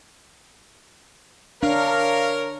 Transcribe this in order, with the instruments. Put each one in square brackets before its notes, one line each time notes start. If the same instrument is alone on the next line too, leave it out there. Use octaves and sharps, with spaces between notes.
[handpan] D4 [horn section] A#4 [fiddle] C#5 [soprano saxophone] F5